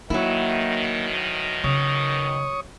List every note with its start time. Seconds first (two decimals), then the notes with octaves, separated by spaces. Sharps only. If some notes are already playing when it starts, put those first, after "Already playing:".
0.10 G#2 B2 D#3 F#3 A#3 E4
1.64 C#3 C#5 C#6 D#6